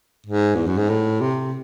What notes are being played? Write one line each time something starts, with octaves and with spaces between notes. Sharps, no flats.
G#2
E2
F#2
G#2
A2
C3